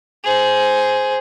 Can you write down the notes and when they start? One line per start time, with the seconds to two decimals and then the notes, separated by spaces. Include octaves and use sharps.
0.24 G#4 C5